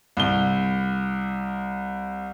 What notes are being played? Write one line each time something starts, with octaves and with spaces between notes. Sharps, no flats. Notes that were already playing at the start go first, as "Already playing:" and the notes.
C2 G7